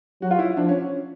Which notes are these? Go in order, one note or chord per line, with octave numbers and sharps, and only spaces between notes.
F#3 F#4
F4
E4
F3 D4
C#4